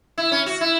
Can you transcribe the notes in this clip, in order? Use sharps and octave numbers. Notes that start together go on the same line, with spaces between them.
E4
C#4
F#4
E4